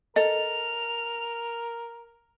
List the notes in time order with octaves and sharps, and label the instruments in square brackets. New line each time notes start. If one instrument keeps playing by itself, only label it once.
[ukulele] A4 [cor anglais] A#4 [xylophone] D#5 [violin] F6